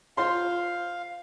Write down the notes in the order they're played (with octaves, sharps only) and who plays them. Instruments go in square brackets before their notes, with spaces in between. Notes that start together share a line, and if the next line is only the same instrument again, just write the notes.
[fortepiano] F4 C5 C6 [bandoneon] F5